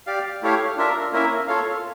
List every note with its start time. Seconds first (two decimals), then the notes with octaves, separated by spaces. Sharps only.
0.07 G4 D5 F5
0.42 A3 E4 G4 C#5 F5
0.77 D4 F4 A#4 E5
1.12 A#3 C#4 E4 A#4 E5
1.48 F4 A4 C#5 F5